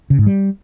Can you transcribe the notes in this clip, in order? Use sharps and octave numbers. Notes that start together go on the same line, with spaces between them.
C#3
G#2
G3